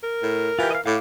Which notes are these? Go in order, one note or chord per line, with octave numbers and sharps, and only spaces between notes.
A#4
A2
E3 F4 G4
D#5 F5
A2 F5 D6